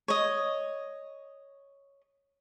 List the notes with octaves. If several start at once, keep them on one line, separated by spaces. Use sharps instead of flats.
C#5 D#5